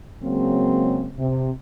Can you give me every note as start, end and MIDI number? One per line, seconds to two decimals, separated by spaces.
0.23 1.09 49
0.23 1.09 54
0.23 1.09 56
0.23 1.09 58
0.23 1.09 60
1.18 1.49 48